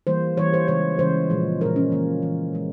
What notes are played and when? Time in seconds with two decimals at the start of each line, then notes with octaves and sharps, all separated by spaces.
0.07 E3 G3 A#3 C5
0.37 E3 G3 A#3 C#5
0.54 C5
0.68 C#3 E3 G#3 C#5
0.99 C#3 E3 G#3 C5
1.30 A#2 F3 G#3
1.61 A#2 F3 G#3 A#4
1.76 C#4
1.91 E3 G#3 A#3
2.22 E3 G#3
2.53 A#2 G#3